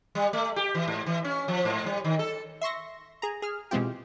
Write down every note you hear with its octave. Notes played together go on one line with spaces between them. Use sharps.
G3
A3
G4
E3
G#2
E3
C#4
F3
G#2
G3
D#3
A4
E5 C6 C#6 A#6
G#4 A#5
G#4 F6
B2 E3 G#3 C4 F4 G4